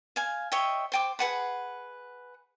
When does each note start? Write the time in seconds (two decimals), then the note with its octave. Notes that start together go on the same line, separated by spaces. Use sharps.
0.16 F5 G#5
0.52 C#5 D#5 E5 G5
0.92 C5 G5 D6
1.19 G#4 B4 F#5 B5